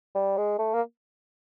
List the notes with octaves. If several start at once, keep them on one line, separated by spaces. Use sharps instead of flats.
G3
G#3
A3
A#3